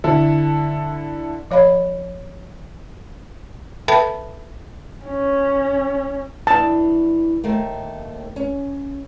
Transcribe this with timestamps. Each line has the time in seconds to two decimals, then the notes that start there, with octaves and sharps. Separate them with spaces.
0.04 D3 E4 A4
1.51 F3 C#5 F5 B5
3.88 A4 B4 E5 G5 A5 B5
5.05 C#4
6.47 E3 D4 A5
7.44 D#2 A3 A#3
8.36 C#4